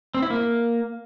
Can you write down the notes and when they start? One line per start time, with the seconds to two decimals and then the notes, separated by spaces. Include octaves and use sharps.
0.14 C4
0.22 E4
0.30 A#3